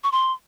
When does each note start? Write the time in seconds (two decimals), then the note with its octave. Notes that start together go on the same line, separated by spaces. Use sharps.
0.04 C#6
0.12 C6